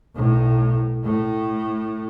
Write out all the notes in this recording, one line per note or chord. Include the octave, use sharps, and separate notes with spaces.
B1 A2
A2 A3